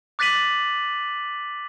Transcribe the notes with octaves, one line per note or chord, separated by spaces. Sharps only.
D6 F#6 A6 B6 D#7 F#7